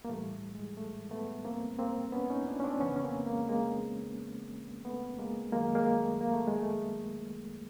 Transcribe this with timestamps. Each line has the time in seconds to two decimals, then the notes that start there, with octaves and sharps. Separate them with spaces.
0.05 A#3
0.09 A2 E3 G3 A3
0.55 G#3
0.77 A3
1.11 A3 B3
1.45 A#3 C4
1.79 A#3 C4
2.12 B3 C#4
2.30 C#4 D#4
2.47 D4 E4
2.60 C#4
2.64 C4 D4
2.80 F2 C#3 E3 B3 C#4
2.96 C#4
3.03 A#3 C4
3.26 G#3 A#3
3.49 G#3 A#3
4.85 A3 B3
5.18 G#3 A#3
5.52 F#2 D#3 F#3 G#3 A#3
5.75 G#3 A#3
5.97 A3
6.21 A#3
6.33 A3
6.47 G#3
6.60 A3